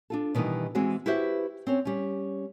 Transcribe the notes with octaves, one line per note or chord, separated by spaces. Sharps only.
D4 F4 A4
B2 D#3 E3 G3 B3
E3 G#3 C4 F#4 G#4
E4 F#4 G4 B4 C5 E5
C4 C#4 C#5
G3 C#4